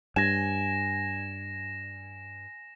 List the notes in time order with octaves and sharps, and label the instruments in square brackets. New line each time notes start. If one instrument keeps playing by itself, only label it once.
[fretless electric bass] G2 [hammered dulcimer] G#5 [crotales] A#6 E7